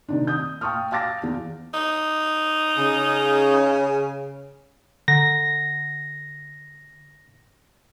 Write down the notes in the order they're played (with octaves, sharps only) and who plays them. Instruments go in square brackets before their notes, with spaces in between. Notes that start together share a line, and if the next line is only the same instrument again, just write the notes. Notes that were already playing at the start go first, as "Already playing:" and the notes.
[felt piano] C3 D#3 D4
D#6 G6
F5 G5 A5 C#6 D#6 F6
F5 A5 D6 A6 A#6
E2
[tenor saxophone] D#4
[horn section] C#3
[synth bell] D3 [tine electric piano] A#6